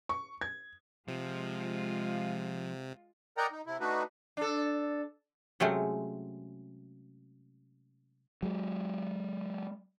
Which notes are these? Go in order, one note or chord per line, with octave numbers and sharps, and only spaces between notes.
C#6
G#6
C3 F3 G#3 F4
A#4 D5 D#5 F#5 G5 A#5
D#4
C3 E4
A3 D4 D#4 F#4 B4
D4 A4
C3 F#3 G#3 A3 C4 C#4
F#3 G#3